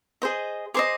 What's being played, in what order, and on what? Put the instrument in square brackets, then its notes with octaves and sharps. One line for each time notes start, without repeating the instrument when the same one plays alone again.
[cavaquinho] G#4 C5 D#5
G#4 C5 D#5 C6 D6